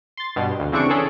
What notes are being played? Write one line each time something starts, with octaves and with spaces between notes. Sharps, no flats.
C6 A6
G2 B2
D2
C#3 E3 C4 D4 C#6 D7
C#4 G#4 A4